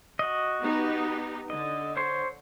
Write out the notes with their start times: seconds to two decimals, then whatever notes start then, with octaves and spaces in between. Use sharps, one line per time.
0.19 F#4 D#5
0.62 B3 D#4 G4
1.50 D3 D#5
1.97 C5 C#5 C6